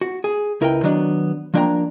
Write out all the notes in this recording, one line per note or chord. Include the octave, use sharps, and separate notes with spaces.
F#4
G#4
C#2 E4 A#4 B4 D#5 G5
D#3 F#3 B3 D4
F3 A#3 D4 D#5 G5 A#5